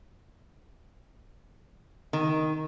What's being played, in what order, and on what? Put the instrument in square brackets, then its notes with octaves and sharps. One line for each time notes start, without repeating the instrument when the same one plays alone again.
[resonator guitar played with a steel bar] D#3